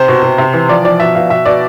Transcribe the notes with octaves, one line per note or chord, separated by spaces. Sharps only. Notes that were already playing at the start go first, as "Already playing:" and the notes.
Already playing: C3 C5
B2
B2
C3
E3
F3 D5
F3 D5
B2 E5
B2 F5
B2 E5
B2 D5